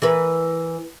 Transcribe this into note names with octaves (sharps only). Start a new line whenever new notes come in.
E3 A#4 B4